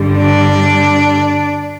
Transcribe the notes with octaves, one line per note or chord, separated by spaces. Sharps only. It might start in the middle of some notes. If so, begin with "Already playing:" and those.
Already playing: G2 D3 G3
D4 D5